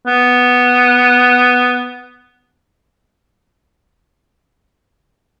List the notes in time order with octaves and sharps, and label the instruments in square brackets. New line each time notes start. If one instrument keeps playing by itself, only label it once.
[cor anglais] B3